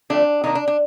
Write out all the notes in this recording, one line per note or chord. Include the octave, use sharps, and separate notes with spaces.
D3 F3 A3 C4 D4
C3 D#3 A#3 D4 D#4
D4
D4